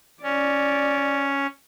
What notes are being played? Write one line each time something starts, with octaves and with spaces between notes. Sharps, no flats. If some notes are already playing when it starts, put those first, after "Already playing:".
C#4 D5